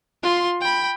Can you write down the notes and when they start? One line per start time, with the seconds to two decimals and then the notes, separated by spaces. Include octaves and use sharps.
0.23 F4 C6
0.61 G5 B5